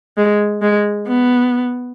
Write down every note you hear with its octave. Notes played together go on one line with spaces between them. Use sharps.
G#3
G#3
B3